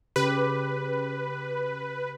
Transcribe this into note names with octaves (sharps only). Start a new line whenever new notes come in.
C#3 G4 B4